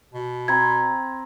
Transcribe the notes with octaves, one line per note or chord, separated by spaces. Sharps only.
B2
C4 A#5 B5 G#6